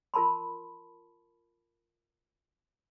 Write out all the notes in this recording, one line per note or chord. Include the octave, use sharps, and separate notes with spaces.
F4 A#4 A5 B5 C6